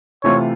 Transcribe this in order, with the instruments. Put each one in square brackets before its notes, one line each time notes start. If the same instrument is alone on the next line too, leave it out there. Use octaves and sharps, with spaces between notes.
[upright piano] C3 E3 A3 C4 F4 [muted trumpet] C#5